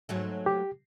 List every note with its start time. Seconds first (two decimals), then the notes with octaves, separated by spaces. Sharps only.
0.09 G#2 F#3 A3
0.46 G4